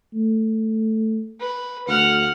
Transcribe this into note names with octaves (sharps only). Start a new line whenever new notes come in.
A3
B4
D2 F#5 F6